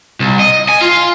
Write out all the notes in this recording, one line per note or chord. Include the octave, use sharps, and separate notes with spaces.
C2
D#5
G#5
F4